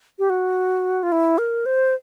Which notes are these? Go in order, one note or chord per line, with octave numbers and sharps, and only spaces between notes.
G4
F#4
F4
E4
A#4
C5